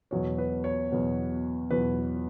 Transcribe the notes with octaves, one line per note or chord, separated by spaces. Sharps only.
E2 B2 F#3 C#5
B4
C#5
E2 B2 F#3
E2 B2 F#3 B4